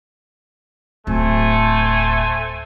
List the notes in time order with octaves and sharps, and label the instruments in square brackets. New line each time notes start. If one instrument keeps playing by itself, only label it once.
[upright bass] D1 [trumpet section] A3 C5 G#5